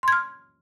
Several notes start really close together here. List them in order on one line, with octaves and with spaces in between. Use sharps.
C6 G#6 F6